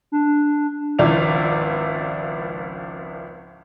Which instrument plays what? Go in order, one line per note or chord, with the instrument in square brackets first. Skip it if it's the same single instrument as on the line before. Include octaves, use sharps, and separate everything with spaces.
[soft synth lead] D4
[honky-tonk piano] G#1 C#2 F3 E4 D5 F7